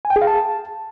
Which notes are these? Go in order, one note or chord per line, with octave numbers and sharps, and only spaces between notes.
G#5
G5
G#4
F5
A5